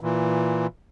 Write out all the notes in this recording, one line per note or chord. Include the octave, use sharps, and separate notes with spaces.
A#2 E3